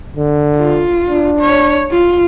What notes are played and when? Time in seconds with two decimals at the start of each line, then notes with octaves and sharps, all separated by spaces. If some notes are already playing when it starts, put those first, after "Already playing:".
0.17 D3
0.58 F4
1.07 D4
1.40 C#5
1.92 F4